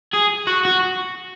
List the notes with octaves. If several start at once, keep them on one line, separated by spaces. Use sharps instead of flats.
G#4
F#4
F#4